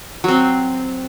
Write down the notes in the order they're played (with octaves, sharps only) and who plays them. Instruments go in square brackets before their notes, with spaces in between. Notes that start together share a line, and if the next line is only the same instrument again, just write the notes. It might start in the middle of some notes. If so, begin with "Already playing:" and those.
[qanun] F#3 C4